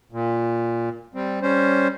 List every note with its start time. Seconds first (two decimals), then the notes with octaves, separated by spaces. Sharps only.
0.12 A#2
1.14 G3 C4
1.42 G3 C#4 C5